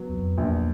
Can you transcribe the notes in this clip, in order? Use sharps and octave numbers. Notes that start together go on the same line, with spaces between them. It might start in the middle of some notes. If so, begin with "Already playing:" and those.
Already playing: F#3 B3
E2
F2
A#1 E2